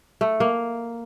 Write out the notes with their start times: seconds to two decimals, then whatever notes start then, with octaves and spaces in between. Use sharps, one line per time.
0.21 A3
0.40 A#3